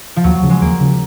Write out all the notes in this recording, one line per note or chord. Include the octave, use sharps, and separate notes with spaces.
F3
D#2 F#3
C#3 F3
G#3
D#2 A#3
C#3 F3